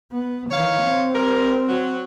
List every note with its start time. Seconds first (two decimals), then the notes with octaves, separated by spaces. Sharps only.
0.12 B3
0.50 D#3 E3 C#5 F5
0.82 C4
1.13 G3 A#4
1.67 F#3